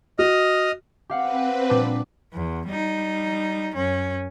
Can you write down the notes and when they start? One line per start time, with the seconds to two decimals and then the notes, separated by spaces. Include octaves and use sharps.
0.19 F#4 D#5 D#6 F6
1.09 C4 G4 B4 F5 F#5
1.70 A#2 G3 D4
2.33 E2
2.68 G3 D#4
3.75 F#2 C#4